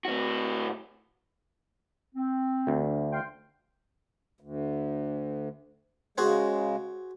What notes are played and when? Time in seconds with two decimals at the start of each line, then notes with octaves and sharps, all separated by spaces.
0.05 A2 F#4
2.15 C4
2.67 D2
3.12 F5 G5 C6
4.40 D2
6.18 C#3 G#3 F#4 G#4 C5